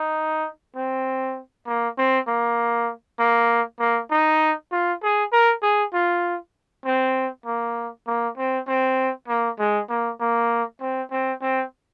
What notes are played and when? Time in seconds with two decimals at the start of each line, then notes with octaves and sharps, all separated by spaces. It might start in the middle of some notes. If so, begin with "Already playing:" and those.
Already playing: D#4
0.76 C4
1.67 A#3
1.98 C4
2.27 A#3
3.19 A#3
3.80 A#3
4.11 D#4
4.72 F4
5.03 G#4
5.33 A#4
5.62 G#4
5.93 F4
6.85 C4
7.46 A#3
8.07 A#3
8.38 C4
8.68 C4
9.28 A#3
9.59 G#3
9.89 A#3
10.21 A#3
10.81 C4
11.11 C4
11.42 C4